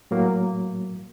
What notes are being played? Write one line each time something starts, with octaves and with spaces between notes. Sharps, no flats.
A2 F#3 A#3